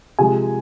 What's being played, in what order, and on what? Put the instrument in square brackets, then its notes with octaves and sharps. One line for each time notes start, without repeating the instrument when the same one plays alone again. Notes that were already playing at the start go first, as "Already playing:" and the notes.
[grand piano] C3 F3 G#3 G#5